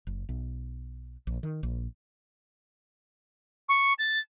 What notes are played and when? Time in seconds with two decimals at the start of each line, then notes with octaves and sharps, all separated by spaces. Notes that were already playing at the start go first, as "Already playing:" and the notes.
0.07 F#1
0.29 B1
1.27 A#1
1.43 D#3
1.63 A#1
3.69 C#6
3.99 A6